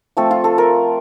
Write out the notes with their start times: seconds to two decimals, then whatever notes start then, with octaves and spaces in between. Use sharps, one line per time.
0.17 F3 A3 C4 A4
0.31 F4
0.44 A4
0.58 A#4